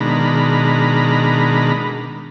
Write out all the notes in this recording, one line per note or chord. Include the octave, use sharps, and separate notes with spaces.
B2 D#3 G#3 D4 A#5 B5